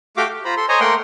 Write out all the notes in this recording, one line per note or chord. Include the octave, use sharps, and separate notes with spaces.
A3 F#4 G4 F5 G5 D6
G4
F4 C5 A#5 B5
A4 C6
C5 C#5 D#5 G#5 A#5
A3 A#3 A#4 F#5 G5 C6